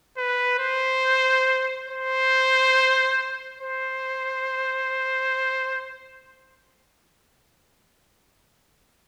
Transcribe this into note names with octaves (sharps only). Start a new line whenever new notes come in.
B4
C5
C5
C5